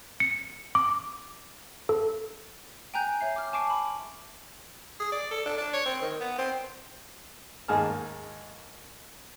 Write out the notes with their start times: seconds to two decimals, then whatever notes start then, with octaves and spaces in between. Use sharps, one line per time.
0.20 C#7
0.75 D6
1.89 A4
2.94 G5 G#5 A#5 F#6 G6
3.21 C#5 E5 C7
3.36 D6 F6
3.53 G#5 A5 C#6 D6 C7 D7
3.70 B5
5.00 G#4
5.12 D5
5.31 A4
5.46 D4
5.58 D4
5.73 C#5
5.86 C4
6.02 D#3
6.21 B3
6.38 C4
7.68 D#2 G#2 G#4 A5 F6